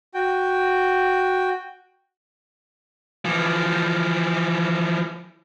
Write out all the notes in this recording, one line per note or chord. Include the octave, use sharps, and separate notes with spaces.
F#4 G5
E3 F3